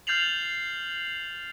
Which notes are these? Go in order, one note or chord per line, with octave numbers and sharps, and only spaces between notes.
F6 G6 A6 C7 F7 F#7